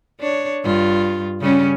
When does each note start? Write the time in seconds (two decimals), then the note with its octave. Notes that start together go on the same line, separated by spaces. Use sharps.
0.20 D4 C#5
0.64 G2 F4
1.41 C#3 G3 C#4